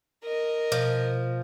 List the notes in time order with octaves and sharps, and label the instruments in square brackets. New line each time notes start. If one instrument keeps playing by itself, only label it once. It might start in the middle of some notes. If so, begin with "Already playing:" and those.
[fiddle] A#4 D#5
[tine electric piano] B2 [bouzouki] F3